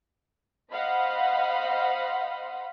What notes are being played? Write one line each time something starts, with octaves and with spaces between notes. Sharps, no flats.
C5 D#5 F5 F#5 B5